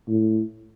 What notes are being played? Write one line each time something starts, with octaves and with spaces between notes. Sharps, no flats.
A2